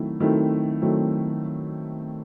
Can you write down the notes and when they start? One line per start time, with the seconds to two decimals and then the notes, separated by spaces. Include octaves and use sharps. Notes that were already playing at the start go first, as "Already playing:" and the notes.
Already playing: D#3 F#3 A3 C4 E4
0.20 D#3 F#3 A3 C4 E4
0.82 D#3 F#3 A3 C4 E4